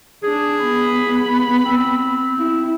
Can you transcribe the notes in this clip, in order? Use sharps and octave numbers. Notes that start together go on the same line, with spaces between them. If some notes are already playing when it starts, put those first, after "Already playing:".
D4 G#4
B3 B5
C4
E4